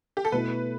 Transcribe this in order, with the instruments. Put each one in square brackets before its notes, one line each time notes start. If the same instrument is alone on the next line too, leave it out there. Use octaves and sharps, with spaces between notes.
[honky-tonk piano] G4
A4
[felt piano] B2 A3 E4 [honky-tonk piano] B4